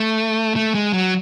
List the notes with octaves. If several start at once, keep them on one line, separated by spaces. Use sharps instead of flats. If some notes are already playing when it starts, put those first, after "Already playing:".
Already playing: A3
A3
G#3
F#3